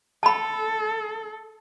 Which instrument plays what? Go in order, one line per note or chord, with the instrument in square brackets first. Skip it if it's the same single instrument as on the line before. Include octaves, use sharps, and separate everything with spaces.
[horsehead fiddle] A4 [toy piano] A5 B5